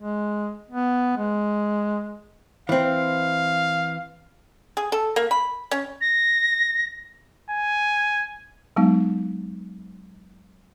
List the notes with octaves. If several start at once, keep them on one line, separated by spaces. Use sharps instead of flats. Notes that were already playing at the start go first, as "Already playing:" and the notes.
G#3
B3
G#3
E3 C4 F5
G#4
A4
A#3
B5
C#4
A#6
G#5
F#3 G#3 B3 D#4